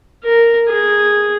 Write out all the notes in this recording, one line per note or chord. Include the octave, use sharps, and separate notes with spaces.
A#4
G#4